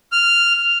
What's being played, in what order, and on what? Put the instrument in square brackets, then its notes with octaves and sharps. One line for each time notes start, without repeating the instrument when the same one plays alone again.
[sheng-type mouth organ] F6